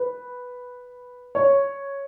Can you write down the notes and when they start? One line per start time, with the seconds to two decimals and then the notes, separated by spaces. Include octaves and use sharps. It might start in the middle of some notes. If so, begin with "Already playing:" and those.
Already playing: B4
1.35 C#5